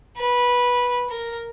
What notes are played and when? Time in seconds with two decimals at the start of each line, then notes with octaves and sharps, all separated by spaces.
0.17 B4
1.10 A#4